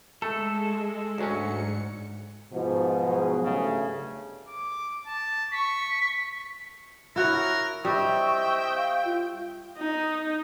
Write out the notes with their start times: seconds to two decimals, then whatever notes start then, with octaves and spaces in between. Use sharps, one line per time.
0.22 G#3 A3 A4
1.18 D2 G#2 F#3 C#4 C#7
2.52 G#2 B2 F3
3.05 F#3 G#4
3.44 G2 C#3 A3
4.49 D6
5.07 A5
5.52 C#6 B6
7.16 E4 F#4 A#4 C#5
7.85 G3 C4 D#5 E5 G5 C#6
8.76 F5
9.05 F4
9.78 D#4